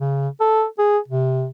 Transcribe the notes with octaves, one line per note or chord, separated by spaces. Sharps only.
C#3
A4
G#4
C3